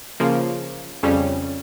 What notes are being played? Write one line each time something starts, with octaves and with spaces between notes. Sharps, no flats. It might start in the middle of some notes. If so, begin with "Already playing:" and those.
C#3 F3 A#3
F2 C#3 G3 C#4